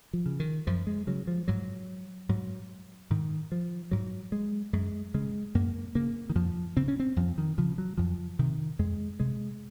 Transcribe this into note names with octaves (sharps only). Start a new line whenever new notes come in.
F3
C#3
D#3
F#2 F3
G#3
C#3 F#3
F3
G#2 F#3
G#2 F#3
G#2 D#3
F3
G#2 F#3
G#3
F#2 G#3
C#3 G#3
F#2 A#3
C#3 A#3
D#3
F2 F3
C#3 C4
C#4
C4
F2 F3
D#3
C#3 F3
F#3
F2 F3
C3 D#3
F2 G#3
C3 G#3